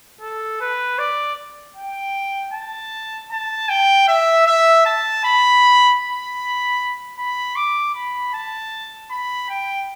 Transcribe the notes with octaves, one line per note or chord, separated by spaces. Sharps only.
A4
B4
D5
G5
A5
A5
G5
E5
E5
A5
B5
B5
B5
D6
B5
A5
B5
G5